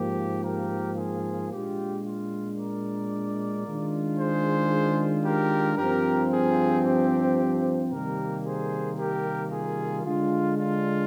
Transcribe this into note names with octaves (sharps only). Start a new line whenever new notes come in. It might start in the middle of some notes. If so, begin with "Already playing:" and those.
Already playing: G#2 F3 A#3 G4
G4 A#4
F4 G#4
A#2 G#3 D4 F4 G4
F4
A#4 D5
D#3 G#3 D4 F4
G#4 C5
G4 A#4
G2 F3 C4 G4 A#4
F4 G#4
G4
C3 D#3 G3 A#3 G4 A#4
G#4 C5
G4 A#4
F4 G#4
D3 G#3 D4 F4
F4